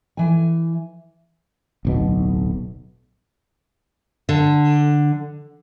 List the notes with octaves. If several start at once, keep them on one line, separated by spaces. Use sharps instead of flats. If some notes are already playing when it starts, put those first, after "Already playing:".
E3 G#5
D1 B1 B2
D3